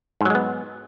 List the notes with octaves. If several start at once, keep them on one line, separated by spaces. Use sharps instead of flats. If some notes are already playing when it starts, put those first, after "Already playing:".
G#2 F#3 G#3 B3